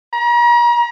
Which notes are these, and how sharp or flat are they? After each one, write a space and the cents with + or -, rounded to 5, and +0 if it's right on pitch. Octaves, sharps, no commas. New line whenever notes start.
A#5 +40